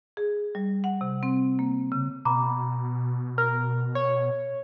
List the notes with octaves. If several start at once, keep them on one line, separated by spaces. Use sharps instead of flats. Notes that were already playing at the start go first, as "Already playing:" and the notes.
G#4
G3
F#5
C3
C4
A#3
C#3
B2 A#5 B5 D6
A#4 F6
C#5